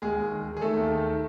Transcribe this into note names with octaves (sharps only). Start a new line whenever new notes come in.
D#2 G#3 G#4
D#2
D#3
D#3
G#4
D#3 A3 A4
D#2
D#3